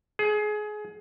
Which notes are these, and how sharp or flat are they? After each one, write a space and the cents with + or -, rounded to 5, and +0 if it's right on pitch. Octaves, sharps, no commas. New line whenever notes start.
G#4 +25